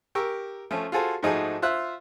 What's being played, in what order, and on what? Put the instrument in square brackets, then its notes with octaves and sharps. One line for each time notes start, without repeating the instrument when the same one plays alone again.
[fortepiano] G4 A#4 C#6 E6
F3 A3 C#4
F4 F#4 G#4 A4 C5
G#2 F3 A3 D#4 F#4 G#4
F4 C5 E5 F#6